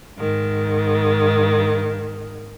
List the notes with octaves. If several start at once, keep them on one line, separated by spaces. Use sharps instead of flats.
G#2 D#3